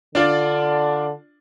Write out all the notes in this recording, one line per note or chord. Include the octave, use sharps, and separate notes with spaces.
D3 D4 F4 D5